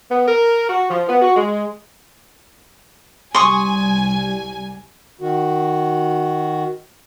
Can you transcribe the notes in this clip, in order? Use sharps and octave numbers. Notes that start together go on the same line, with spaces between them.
B3
A#4
F#4
F3
B3
F#4
G#3
C2 G3 G#5 C6 C#6 D#6
D#3 F#4